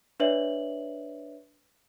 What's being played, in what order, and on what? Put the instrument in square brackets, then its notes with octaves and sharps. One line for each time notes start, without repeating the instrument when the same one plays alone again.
[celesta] D4 B4 C#5 D5 E5 F#7